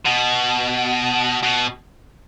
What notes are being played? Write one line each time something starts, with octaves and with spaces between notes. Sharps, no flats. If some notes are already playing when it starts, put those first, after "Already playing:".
B2
B2